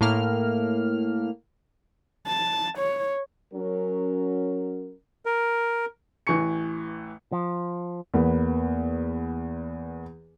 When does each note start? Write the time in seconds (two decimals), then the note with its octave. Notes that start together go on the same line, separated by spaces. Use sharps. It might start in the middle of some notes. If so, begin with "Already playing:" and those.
0.01 A2 A#3 F6
2.27 A5
2.78 C#5
3.53 F#3 C#4 A#4
5.25 A#4
6.27 A1 E3 G#5 C#6 C#7
7.32 F3
8.14 E2 A#3 B3